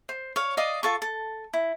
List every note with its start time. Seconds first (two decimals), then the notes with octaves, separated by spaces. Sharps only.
0.09 C5
0.36 C#5 F5
0.57 D5 D#5 F5 D#6
0.83 F4 A4 C#6
1.02 A4
1.53 E4